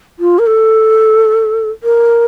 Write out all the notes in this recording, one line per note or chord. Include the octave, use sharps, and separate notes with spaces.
F4
A#4
A4
A#4